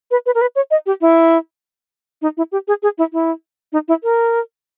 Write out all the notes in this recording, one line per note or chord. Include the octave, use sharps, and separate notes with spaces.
B4
B4
A#4
B4
C#5
D#5
G4
E4
D#4
E4
G4
G#4
G#4
E4
E4
D#4
E4
A#4